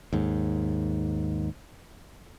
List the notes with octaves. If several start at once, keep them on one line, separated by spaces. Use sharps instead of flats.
D#2 G#2